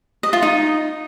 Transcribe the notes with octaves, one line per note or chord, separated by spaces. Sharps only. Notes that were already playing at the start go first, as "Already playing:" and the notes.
D#5
F4
D#4